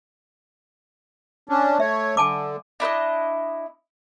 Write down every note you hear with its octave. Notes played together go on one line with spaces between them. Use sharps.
C#4 D4
A3 C#5 E5
D3 G#5 A5 D6
D4 E4 B4 D#5